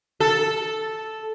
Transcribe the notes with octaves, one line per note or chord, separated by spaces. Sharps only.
A4